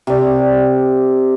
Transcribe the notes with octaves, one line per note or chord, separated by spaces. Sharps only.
C3 D5